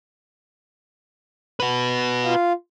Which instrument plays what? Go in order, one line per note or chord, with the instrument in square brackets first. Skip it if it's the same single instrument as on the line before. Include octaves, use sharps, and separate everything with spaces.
[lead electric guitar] F#4 B4
[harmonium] F4 F5